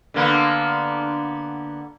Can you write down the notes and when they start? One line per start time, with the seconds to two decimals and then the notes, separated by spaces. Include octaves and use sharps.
0.14 D3 A#3 B3